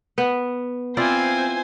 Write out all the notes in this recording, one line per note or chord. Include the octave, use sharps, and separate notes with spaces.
B3
C4 E4 F4 C5 D5 G#5